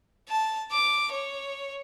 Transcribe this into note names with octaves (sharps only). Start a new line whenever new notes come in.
A5
D6
C#5